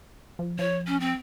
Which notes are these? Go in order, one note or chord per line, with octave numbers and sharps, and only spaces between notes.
F3
F3 C#5
C#4
C4